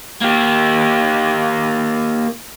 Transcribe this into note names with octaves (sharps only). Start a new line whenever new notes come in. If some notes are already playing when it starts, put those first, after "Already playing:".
A#3 G4